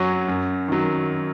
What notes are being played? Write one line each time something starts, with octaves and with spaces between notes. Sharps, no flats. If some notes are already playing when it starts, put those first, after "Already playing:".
Already playing: F#2 F#3 C#4 F#4
F#2
D#3 F#3